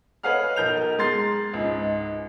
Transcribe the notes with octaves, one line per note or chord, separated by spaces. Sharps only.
B4 C#5 D#5 F5 F#5 F6
B1 A#4 G6 F7
G#3 A#5 C6 A6 C7
C#2 G#2